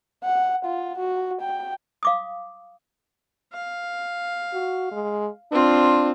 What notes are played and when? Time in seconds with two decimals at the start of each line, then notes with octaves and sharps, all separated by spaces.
0.24 F#5
0.65 F4
0.98 F#4
1.41 G5
2.03 F5 D6 D#6
3.53 F5
4.53 F#4
4.91 G#3
5.52 C4 D4 F4